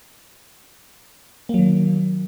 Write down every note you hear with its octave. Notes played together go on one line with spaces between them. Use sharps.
D#3 F#3 A#3